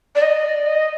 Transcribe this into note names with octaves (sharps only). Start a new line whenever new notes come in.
D5
D#5
D5
D#5